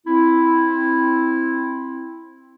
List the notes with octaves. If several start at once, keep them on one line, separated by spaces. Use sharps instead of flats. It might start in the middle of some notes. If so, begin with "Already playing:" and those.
C4 E4